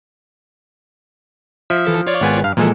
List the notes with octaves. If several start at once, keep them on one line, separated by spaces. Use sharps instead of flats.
F3 E5
E3 A4
F4 C#5 D5
G#1 B3 G#5
G2 F5
A#2 E3 F3 G#3 A4